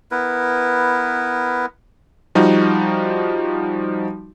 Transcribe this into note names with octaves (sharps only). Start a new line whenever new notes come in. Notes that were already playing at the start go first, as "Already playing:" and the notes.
B3 E4 A#4 B4
F3 G3 D#4 F#4